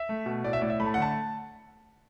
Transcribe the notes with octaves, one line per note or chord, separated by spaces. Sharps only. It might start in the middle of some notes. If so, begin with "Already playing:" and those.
Already playing: E5
A3
B2
A2 D5
E5
A2 D5
E5
A3 B5
A5
F#5
D3 A5